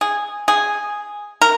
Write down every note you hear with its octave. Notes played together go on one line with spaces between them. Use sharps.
G#4
G#4
A#4